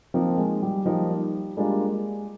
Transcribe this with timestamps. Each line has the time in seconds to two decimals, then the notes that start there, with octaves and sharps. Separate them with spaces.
0.14 F3 A#3 C4 D#4
0.37 G#3
0.62 G3
0.86 F3 G3 A#3 D#4
1.57 G3 G#3 A#3 D4 F4